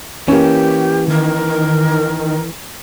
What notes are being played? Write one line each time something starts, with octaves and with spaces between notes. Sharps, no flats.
E3 A#3 C#4 G4
D#3 A#4